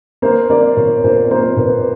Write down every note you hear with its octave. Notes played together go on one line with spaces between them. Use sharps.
A#3 C5
A#3 D5
A#2 C#5
A#2 C5
A#3 C5
A#2 B4